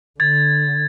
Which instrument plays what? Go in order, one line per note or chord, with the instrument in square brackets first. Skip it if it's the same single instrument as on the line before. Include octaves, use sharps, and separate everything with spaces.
[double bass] D3 [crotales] G#6 A6